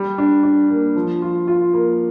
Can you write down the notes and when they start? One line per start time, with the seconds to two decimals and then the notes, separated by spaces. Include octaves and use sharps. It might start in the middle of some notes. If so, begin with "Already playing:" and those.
Already playing: G3
0.18 D4
0.43 D4
0.70 A#3
0.96 F3
1.22 F4
1.47 F4
1.73 A#3